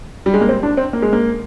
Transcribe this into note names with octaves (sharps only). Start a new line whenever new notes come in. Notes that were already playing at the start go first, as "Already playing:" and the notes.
G3
G#3
A#3
C4
D4
C4
A#3
G#3
A#3